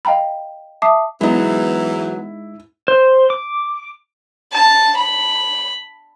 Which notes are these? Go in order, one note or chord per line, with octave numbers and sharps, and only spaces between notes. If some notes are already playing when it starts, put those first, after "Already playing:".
D#5 F5 G5 A#5 B5
E5 A5 D6 D#6 C7
G#2 E3 F#3 G#3 B3 D#4 E4
C5
D6
A5
B5